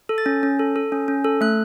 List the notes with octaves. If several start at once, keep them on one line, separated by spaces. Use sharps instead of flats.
A4
A6
C#4
C#4
A4
A4
C#4
C#4
A4
A3 F#6